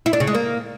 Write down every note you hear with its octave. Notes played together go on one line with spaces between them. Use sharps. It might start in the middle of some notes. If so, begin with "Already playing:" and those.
E4
D4
C#3
G#3
A#3